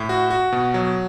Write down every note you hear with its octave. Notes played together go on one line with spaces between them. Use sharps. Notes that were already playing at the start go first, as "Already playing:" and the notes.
Already playing: A2
F#4
F#4
B2
F#3